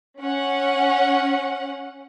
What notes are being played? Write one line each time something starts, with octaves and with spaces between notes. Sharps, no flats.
C#4 F#5